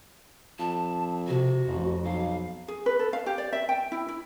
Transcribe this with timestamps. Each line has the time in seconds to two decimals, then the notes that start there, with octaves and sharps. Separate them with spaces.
0.59 F2 A5
1.28 C3 F#4
1.67 A1 F2
2.04 B1 F5
2.68 G#4
2.86 B4
2.99 A4
3.13 F5
3.26 G4
3.38 D5
3.53 E5
3.69 G5
3.92 E4
4.08 E4